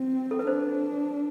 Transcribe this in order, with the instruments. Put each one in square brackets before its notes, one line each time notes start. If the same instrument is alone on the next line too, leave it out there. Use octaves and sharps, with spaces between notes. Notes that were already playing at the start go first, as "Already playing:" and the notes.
Already playing: [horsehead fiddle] C4
[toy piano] A4
B4
[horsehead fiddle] D4 [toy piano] C5